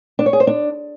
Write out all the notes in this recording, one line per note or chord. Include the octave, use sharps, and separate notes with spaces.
D4
C#5
G#4
C5
D4